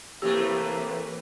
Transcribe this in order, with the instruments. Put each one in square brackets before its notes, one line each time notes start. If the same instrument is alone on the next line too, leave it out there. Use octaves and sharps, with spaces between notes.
[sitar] A2 C3 A3 [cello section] E3 B4 [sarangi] A#3 [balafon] G4